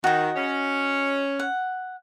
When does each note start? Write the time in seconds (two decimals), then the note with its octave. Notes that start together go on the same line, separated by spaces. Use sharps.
0.04 D#3 F#4 D#5
0.36 C#4
1.39 F#5